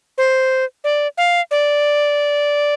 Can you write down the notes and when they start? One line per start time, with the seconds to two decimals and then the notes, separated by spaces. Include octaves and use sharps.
0.18 C5
0.84 D5
1.18 F5
1.51 D5